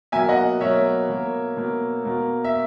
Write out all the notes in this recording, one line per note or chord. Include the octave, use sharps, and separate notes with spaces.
B2 F#3 A#3 E5 G#5
D#5 F#5
B2 F#3 A#3 C#5 E5
B2 A#3
B2 A#3
B2 A#3
E5